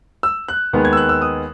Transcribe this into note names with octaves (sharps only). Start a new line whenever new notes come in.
E6
F#6
D#2 D#3 G#3 B3
G#6
E6
F#6
E6
D#6